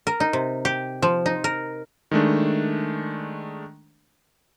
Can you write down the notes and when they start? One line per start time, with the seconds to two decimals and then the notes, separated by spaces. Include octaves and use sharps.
0.07 A#4
0.20 D#4
0.33 C3
0.65 G4
1.02 F3
1.26 D#4
1.44 A#4
2.11 D#3 G#3 A3 D4